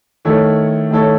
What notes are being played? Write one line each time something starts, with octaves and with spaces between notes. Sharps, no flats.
D#3 A3 E4 A4 C#5
D#3 A3 E4 A4 C#5